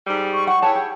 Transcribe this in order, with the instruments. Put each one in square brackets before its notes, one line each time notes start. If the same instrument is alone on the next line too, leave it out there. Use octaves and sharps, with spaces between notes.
[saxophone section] G#2 G3
[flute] C#6
[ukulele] F#5 [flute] C#6
[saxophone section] E4 G#4 C#5 [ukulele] B4 A5 [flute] G5
[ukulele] G4